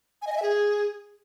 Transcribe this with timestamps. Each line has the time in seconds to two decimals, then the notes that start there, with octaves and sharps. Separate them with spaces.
0.22 G#5
0.27 D#5
0.32 G#5
0.37 E5
0.42 G#4